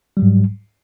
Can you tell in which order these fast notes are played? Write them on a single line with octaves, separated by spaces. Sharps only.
G3 F#3 G#2